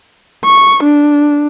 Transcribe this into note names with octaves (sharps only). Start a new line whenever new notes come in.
C#6
D4